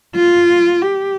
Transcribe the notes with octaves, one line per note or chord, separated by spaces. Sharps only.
F4
G4